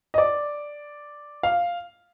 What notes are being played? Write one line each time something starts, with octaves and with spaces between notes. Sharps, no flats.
D#5
D5
F5